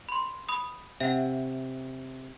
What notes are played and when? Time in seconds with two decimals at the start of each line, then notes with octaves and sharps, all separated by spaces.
0.09 B5 C6
0.49 B5 D#6
1.00 C3 E5 F#5